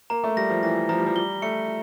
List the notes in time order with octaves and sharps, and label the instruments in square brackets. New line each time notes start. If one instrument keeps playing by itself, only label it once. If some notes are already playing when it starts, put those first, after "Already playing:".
[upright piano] A#3 [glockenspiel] A#5
[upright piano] A3
[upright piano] G3 [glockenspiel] A#6
[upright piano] F3
[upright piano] E3 [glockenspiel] A#6
[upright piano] F3 [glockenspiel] A#5
[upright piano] G3
F3
[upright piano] G3 [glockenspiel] G7
[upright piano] A3 [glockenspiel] C#7